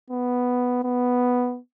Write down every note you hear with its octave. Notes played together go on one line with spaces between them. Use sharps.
B3
B3